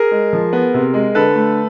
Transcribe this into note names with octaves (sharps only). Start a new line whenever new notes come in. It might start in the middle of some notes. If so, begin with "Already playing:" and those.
Already playing: G#4 A#4
G#3
F3
B3
C3
G#3
D3 A4 B4
A3